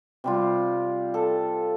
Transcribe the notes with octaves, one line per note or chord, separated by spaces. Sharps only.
C3 G3 F4
A4